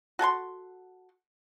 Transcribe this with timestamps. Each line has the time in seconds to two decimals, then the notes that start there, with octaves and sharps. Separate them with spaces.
0.19 F#4 A4 G#5 C6